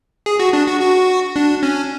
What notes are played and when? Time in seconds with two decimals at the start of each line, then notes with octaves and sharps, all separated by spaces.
0.26 G#4
0.40 F#4
0.53 D4
0.67 F#4
0.81 F#4
1.36 D4
1.63 C#4